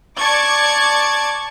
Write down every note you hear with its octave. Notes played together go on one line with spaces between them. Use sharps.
D5 A5 C#6 D6 G#6